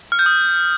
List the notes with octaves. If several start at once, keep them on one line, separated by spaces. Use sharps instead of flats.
F6
G6
D#6